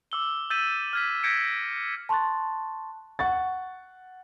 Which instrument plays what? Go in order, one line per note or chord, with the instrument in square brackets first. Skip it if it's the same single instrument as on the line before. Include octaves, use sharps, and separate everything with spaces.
[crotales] D6 E6 G7
E6 G6 A6 B6 D#7 E7
F6 G#6 B6
G6 G#6 A#6 B6 C#7 D7
[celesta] A5 C6 C#6 F#6 A6
[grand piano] F#5 C#6 A6